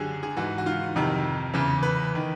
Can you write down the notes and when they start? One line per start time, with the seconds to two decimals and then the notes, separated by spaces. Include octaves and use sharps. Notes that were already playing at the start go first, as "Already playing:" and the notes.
Already playing: F#2 D3 G4 G#4
0.23 G#4
0.37 G#2 E3 F#4
0.58 F#4
0.66 F4
0.96 F2 C3 D#3
1.54 E2 C#3 E3
1.83 B4
2.15 D#3